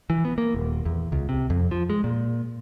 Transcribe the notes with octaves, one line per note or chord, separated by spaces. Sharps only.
E3
B3
A#3
D#1
E2
C#2
C3
F2
F3
G#3
A#2